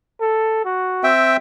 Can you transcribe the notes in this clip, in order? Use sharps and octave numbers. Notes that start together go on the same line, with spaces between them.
A4
F#4
C4 E5 G5